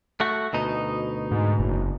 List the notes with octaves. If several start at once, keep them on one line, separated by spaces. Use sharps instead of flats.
A3 F#4
D2 B2 D#4
G#2
F#1